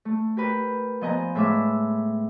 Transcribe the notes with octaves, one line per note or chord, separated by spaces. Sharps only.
A3
G4 A#4 B4
F3 B3 D#5 G#5 A#5
A2 G#3 E5 B5 D6 E6